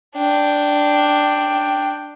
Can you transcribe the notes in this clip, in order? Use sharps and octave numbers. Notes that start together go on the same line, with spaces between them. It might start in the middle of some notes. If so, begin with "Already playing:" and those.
D4 G5